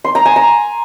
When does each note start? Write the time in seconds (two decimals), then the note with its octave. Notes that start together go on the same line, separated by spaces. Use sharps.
0.04 C6
0.15 A#5
0.25 G#5
0.36 A#5